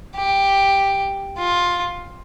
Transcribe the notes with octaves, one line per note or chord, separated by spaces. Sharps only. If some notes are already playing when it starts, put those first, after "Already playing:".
G4
F4